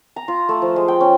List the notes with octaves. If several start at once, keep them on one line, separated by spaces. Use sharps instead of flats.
A#5
F4
A3
F3
G#3
G5
C#4